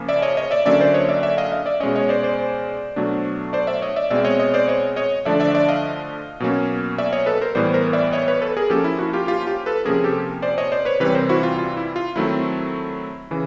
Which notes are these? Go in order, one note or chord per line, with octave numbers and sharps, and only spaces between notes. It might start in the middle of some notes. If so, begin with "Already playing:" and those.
Already playing: C#3 F3 A#3 C#4
D5 E5
C#5 D#5
C#5 D#5
D5 E5
D3 F#3 A#3 C#4 D5 E5
C5 D5
C#5 D#5
D5 E5
D5 E5
D#5 F5
D#5 F5
D5 E5
B2 G#3 C#4 C#5 D#5
C#5 D#5
C5 D5
C5 D5
B2 F#3 A3 D4
C5 D5
D5 E5
C#5 D#5
D5 E5
B2 G#3 C4 D5 E5
C#5 D#5
C#5 D#5
C5 D5
C#5 D#5
C#5 D#5
D3 F3 A3 D4 D5 E5
D5 E5
D5 E5
D#5 F5
B2 F#3 A#3 C#4
D5 E5
C#5 D#5
A4 B4
A#4 C5
A2 E3 G3 B3 C5 D5
A#4 C5
D5 E5
C#5 D#5
B4 C#5
A4 B4
G#4 A#4
F3 A#3 C#4 G4 A4
E4
E4 F#4
F4 G4
F4 G4
F4 G4
A4 B4
C3 F3 A#3 C#4 G#4 A#4
G4 A4
C5 D5
C#5 D#5
C5 D5
B4 C#5
C3 E3 G3 C4 B4 C#5
A#4 C5
E4 F#4
F4
F4
E4
F4
D#3 F#3 A3 C4 E4
C#3 E3